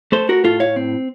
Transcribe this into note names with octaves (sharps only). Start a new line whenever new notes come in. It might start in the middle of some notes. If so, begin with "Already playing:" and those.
A3 A4 C5
F#4 A#4
A2 F4 A4
C#5 F5
C4